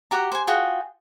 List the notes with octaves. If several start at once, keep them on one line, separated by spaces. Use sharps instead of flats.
F#4 G4 A#5
C5 G#5
F4 F#4 G#4 G5